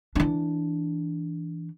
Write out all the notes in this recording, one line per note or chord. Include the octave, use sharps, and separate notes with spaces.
E3 D4